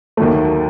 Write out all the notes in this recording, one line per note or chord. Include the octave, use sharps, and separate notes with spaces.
D#2 D#3 F#3 A3